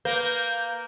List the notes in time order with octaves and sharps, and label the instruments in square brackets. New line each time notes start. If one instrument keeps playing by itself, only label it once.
[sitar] A#3 [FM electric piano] B4 [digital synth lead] G6